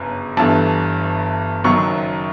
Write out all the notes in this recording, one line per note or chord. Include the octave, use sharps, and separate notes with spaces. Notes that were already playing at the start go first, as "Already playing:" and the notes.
Already playing: G1 F#2 C#3
G1 G2 E3 A3 A5
F#1 F#2 D#3 F#3 C#6